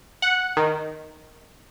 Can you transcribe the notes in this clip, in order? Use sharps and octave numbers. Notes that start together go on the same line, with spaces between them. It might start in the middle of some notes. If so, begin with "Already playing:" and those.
F#5
D#3